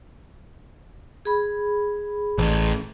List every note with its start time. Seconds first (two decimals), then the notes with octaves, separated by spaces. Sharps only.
1.25 G#4 B5
2.38 A1